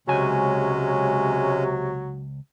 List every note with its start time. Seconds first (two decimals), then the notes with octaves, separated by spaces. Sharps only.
0.08 C#2 C3 F#3 G#3 C#4 G#5